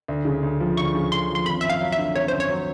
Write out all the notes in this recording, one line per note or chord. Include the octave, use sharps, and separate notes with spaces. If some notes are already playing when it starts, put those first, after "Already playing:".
D2
C#3
D2
F3
D2 C#6
C#3
D2 C6
F3
C6
G#1 B5
F#2 E5
F5
F#3
E5
D3
G#1 C#5
F#2 C5
C#5
F#3